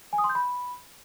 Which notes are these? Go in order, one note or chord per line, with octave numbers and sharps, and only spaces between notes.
G#5
D#6
C6
G6
B5